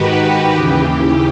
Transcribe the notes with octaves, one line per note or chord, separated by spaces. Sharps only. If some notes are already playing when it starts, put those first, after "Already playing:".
Already playing: G#2 D#3 F#4 G4 B4
D#2 C#3 E3